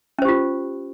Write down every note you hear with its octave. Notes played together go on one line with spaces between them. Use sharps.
C#4 F4 G4 C5